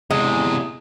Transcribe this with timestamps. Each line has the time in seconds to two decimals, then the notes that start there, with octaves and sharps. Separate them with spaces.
0.11 E2 C3 G#3